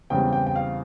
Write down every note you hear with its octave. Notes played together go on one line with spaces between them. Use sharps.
E2 C#3 G3 C4 G5
G5
G5
F5